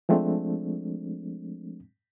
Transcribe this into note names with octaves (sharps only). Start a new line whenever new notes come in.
F3 G#3 A3 C4 D4